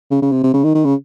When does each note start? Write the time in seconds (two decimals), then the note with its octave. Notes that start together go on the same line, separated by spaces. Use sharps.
0.11 C#3
0.22 C#3
0.32 C3
0.43 C3
0.54 C#3
0.64 D#3
0.75 D#3
0.85 C#3